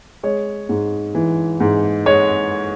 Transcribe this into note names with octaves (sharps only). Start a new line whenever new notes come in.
G#3 C#5
G#2
E3
G#2
G#3 C#5